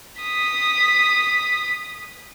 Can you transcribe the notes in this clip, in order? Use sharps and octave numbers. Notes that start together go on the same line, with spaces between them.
D#6 B6